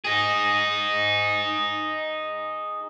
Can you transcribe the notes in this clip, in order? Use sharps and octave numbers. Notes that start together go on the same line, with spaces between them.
D#4 G#4